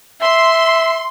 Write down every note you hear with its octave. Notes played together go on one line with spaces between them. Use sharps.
E5 C6